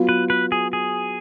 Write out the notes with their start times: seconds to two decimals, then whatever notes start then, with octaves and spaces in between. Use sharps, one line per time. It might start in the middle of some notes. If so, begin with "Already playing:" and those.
Already playing: F#3 B3 F4
0.09 B4
0.30 B4
0.52 G#4
0.73 G#4